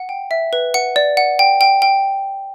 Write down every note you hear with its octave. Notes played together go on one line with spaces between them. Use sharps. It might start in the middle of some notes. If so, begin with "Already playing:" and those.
Already playing: F#5
G5
E5
B4
F#5 C#7
D5
F#5
G5
G5
G5